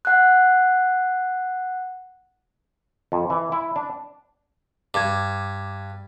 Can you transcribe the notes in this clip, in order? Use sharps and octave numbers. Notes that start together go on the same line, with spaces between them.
F#5 F#6
F2
E3
E4
D4
G2 D6 G#6